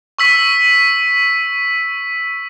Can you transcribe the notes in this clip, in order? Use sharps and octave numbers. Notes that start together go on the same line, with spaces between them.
C#6 E6 B6